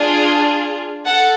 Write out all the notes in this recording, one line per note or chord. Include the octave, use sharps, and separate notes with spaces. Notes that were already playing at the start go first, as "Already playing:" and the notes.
Already playing: D4 F4 G#4
A4 F#5